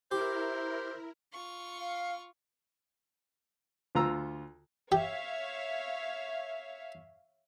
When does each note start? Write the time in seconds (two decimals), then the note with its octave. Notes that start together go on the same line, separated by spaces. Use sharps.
0.11 E4 G4 A#4 C5
1.33 F4 C#6
1.79 F5
3.95 D2 F4 A#5 E6
4.92 G4 C#5 E5 F5